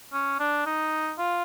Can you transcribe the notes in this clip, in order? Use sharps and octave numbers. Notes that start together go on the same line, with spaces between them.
C#4
D4
D#4
F4